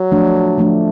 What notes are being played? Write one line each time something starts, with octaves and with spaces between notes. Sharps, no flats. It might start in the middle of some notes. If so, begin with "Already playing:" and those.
Already playing: F#3
F3 A3 D4
F3 A3 D4